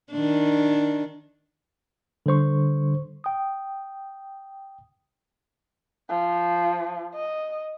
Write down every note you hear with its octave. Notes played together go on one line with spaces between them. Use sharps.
D#3 D4
D3 G3 C5 C#6
G5 D#6
F3
D#5